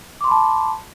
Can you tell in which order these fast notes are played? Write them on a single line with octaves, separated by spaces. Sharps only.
D6 C6 B5 A5